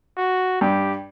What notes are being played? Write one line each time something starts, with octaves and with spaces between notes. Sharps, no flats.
F#4
G2 G4